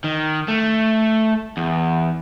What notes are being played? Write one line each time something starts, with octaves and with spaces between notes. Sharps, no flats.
D#3
A3
E2